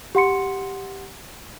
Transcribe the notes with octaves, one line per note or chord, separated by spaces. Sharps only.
G4 F#5 C6 C#7